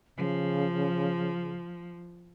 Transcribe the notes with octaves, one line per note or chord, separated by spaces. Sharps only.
C#3 F3